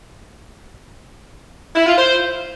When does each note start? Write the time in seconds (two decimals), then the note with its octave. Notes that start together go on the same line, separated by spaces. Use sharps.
1.75 E4
1.86 F4
1.97 C5